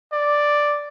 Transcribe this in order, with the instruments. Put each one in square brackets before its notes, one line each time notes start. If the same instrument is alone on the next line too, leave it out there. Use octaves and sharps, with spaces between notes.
[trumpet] D5